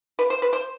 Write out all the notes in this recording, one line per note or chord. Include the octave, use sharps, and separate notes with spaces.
B4
C5
B4
C5